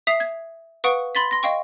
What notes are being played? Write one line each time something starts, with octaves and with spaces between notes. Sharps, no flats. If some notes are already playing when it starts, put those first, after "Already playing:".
E5 D#6 B6 C7 F7
G#6
B4 F5 F#5 C#6 D#6 D7
B5 C6 A6 B6
C6 A#6
D#5 F5 G5 C#6